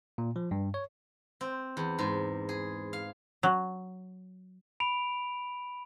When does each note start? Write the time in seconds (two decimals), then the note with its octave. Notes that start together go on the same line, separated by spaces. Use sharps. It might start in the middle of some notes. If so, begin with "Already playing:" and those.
0.18 A#2
0.36 F3
0.51 G2
0.74 C#5
1.41 C4
1.77 E2
1.99 G#2
2.49 G#4
2.93 F5
3.43 F#3
4.80 B5 D7 F7